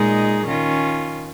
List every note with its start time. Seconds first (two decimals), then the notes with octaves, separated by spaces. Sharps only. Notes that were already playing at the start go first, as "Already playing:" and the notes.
Already playing: A#2 G#3 D#4 G#4
0.46 D#3 C#4 F4